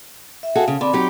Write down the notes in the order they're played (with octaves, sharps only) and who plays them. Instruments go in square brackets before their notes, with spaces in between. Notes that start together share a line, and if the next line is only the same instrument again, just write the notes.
[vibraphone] E5
[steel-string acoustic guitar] F#4 G#4 A4 [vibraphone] F5
[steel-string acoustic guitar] C#3
[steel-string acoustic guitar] D3 [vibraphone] C4 B5 D6
[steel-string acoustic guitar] F#3 D#4 G4